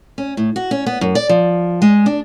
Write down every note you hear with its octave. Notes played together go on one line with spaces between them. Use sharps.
C#4
A2
F#4
C#4
B3
F#2
D5
F3
G#3
D4